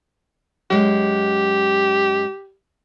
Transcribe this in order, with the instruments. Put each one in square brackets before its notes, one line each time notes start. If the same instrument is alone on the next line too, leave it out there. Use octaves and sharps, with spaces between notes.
[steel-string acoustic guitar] F#2 G#3 [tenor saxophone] G4